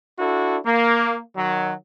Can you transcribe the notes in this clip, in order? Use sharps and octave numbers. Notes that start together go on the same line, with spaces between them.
D4 E4 F#4 A4
A#3
D#3 F#3